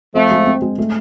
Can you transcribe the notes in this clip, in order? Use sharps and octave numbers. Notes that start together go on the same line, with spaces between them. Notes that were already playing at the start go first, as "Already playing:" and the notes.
F3 A3 C4
G#3
C4
G#3
A3